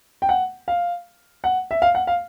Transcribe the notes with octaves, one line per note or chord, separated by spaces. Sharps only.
G5
F#5
F5
F#5
E5
F5
F#5
F5